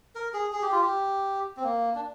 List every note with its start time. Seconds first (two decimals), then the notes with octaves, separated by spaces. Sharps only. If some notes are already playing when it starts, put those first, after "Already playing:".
0.15 A#4
0.34 G#4
0.53 G#4
0.62 G4
0.72 F4
0.82 G4
1.57 C4
1.64 A#3
1.95 D4